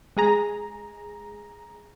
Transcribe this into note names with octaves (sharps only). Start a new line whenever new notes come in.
G#3 G#4 A#5